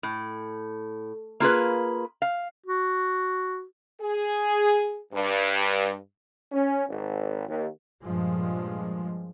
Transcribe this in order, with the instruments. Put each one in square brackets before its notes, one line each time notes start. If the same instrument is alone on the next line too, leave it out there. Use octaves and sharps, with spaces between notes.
[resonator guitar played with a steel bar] A2
A#3 F4 G#4 B4
F5
[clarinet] F#4
[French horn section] G#4
G2
[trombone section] C#4
G#1
D#2
[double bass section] G2 A#2 F3 G#3